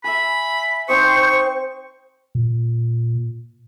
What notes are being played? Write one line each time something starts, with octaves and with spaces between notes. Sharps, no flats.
E5 G#5 B5
C4 D#4 C5 D#5 C#6
A#2